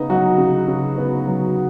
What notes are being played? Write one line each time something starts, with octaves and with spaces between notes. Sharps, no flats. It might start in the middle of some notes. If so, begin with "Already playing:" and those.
Already playing: C#3 B3 D#4
F#3 F#4
C#3
C#3
B3
F#3